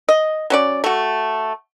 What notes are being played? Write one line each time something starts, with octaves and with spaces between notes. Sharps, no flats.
D#5
F#3 C#4 D5
A3 F#4